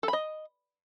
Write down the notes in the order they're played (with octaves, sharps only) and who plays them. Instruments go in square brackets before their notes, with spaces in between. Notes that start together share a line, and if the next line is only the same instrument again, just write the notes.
[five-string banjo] A4
B5
D#5